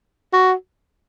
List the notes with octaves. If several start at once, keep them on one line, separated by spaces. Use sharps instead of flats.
F#4